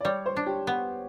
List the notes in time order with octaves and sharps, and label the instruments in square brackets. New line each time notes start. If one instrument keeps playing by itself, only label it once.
[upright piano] D5
[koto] G3 [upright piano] C#5
[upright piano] C5
[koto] D4
[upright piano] G4
[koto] B3